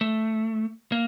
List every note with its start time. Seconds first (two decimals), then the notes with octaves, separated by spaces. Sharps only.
0.01 A3
0.92 A#3